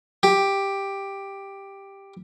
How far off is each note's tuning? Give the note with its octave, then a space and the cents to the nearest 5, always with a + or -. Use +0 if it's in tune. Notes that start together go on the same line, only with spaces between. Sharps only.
G4 +5